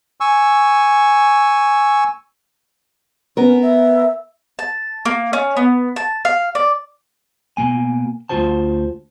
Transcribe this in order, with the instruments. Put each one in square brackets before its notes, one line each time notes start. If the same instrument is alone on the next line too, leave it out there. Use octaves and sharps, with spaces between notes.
[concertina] G#5 C#6 E6
[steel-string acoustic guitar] B3 A#4 [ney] C#4
[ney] E5
[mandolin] A5
A#3
C#4
B3
A5
F5
D5
[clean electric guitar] B2 A#3 G#5
D2 G#2 F4 F#4 C5 A5